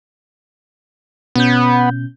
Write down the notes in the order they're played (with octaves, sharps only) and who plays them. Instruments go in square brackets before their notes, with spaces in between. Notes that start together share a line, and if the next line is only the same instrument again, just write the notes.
[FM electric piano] B2 C#4 G6 [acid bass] B3